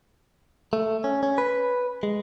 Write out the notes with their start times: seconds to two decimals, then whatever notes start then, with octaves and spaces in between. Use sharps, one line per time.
0.73 A3
1.04 C#4
1.23 C#4
1.38 B4
2.03 G#3